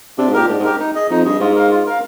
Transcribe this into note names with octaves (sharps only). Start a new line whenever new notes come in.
C3 D4
G#2
A#2 G4 A#4
G#2 D4
G#2
G4 A#4
D#4
G#4 D#5
F2 D#4
G2 G#4 D#5
G#2 F4
A#4 F5
F4
A#4 F5